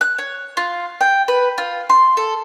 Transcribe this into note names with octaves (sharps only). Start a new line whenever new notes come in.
F#6
C#5
F4
G5
B4
F4
C6
A4